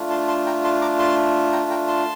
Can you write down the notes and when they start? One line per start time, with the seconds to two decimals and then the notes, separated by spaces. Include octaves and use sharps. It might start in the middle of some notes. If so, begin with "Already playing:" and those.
Already playing: A3 D4 F4
0.10 A5 C6
0.28 A5 C6
0.46 G5 A#5
0.64 A5 C6
0.81 A#5 D6
0.99 A5 C6
1.52 G5 A#5
1.70 G5 A#5
1.87 A5 C6